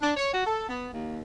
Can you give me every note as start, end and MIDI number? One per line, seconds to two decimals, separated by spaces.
0.02 0.11 62
0.16 0.31 73
0.32 0.45 66
0.45 0.64 69
0.68 0.87 59
0.93 1.19 39